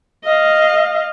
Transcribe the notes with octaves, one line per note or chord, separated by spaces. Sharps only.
D#5 F5